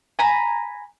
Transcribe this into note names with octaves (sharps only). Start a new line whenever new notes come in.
G#5 A#5 B5